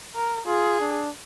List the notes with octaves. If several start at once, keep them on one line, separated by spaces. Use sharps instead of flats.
A#4
F4 G#4
D4